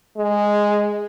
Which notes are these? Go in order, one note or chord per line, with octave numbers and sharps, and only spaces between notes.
G#3